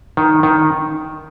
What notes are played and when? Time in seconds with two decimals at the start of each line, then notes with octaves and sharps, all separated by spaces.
0.17 D#3
0.43 D#3